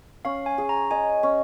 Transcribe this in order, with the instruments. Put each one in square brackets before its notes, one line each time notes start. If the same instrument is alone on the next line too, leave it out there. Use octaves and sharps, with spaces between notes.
[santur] C#4 [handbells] F5
[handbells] G#5
[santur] G#4
[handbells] A#5
[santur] D#5 [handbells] G#5
[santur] C#4